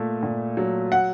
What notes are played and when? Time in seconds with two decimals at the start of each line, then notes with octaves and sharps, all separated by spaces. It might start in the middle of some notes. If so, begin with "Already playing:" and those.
Already playing: A#2 A3
0.23 A#2
0.57 F#3
0.92 F#5